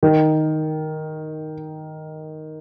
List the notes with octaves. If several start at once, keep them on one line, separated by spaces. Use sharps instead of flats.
D#3